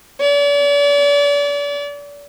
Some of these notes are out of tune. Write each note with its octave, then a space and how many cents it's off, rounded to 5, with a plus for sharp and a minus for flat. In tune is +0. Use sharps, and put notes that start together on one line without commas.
D5 -40